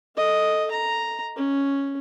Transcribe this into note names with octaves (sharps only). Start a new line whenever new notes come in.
A4 D#5
A#5
C#4